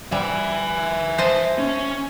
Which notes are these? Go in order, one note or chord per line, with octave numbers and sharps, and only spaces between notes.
G3 E5 G#5
C5 D#5 A5
C#4